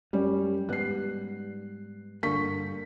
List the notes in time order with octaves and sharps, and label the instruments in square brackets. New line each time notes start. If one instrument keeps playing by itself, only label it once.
[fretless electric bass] F#2 [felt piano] G3 C#4
[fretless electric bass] G#2 G3 B3 [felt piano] F#6 C7
[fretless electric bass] G2 A#3 [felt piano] D3 C#6 B6